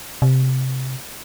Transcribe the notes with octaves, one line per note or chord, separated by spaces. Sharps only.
C3